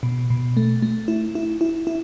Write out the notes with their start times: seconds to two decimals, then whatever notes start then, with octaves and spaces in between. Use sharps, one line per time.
0.03 B2
0.30 B2
0.57 A3
0.82 A3
1.08 E4
1.35 E4
1.61 E4
1.87 E4